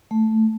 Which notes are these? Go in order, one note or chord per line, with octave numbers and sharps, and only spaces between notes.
A3